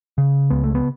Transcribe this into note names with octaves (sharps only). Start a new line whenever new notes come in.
C#3
C#2 B3
A3
B3